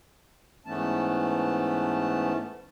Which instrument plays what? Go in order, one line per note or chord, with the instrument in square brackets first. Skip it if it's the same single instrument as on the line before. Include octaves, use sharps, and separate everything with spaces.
[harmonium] G#2 E3 A3 B3 C#4 A5